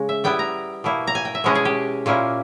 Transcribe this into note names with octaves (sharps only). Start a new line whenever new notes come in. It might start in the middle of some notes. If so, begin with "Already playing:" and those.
Already playing: C#3 G#3
E5
G3 B3 E4 G5
A#5
B2 A#3 E4
A#5
G#5
G5
E5
B2 G#3 C#4 E4 D#5
G#4
G4
A#2 A#3 C#4 E4